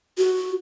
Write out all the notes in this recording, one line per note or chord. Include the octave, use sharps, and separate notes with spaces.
F#4